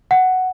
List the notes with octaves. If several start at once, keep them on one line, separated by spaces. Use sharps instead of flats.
F#5